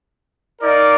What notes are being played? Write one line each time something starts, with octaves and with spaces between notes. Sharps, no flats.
D#4 A#4 D5 F5